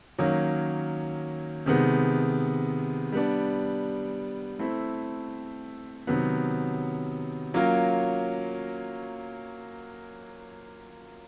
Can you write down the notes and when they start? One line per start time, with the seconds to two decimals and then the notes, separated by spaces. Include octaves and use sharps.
0.19 D#3 F#3 A#3 C#4
1.66 C3 D#3 G#3 B3
3.12 G3 B3 D4
4.59 A3 C4 E4
6.07 C3 D#3 F#3 B3
7.54 F#3 A#3 C#4 F4 A#4